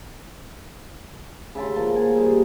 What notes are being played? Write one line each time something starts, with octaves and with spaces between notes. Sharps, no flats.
C#3 E5 A5 C6
F3 A#3 A5
A#3 G#5
G3 G#4 C5